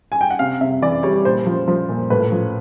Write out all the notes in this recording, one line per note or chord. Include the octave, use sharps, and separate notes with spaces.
G#5
G5
F#5
C3 F5
C3 E5
E3 D5
G3 C#5
A#2 C5
F3
F3
A#2
A2 B4
F3